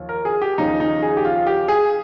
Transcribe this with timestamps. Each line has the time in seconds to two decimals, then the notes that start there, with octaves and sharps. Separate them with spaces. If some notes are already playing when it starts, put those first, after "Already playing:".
Already playing: D#2 F3
0.09 A#4
0.25 G#4
0.42 G4
0.58 D#2 C#3 F3 D#4
0.80 D#4
1.02 G#4
1.17 G4
1.25 F4
1.47 G4
1.68 G#4